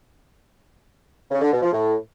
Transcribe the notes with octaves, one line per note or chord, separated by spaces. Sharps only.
C#3
D3
B2
F3
A2